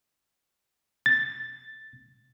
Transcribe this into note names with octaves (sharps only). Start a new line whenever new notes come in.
A6